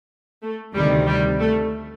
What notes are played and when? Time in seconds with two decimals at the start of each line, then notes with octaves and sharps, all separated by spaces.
0.43 A3
0.75 D2 C3 D#3 G3
1.07 G3
1.40 A3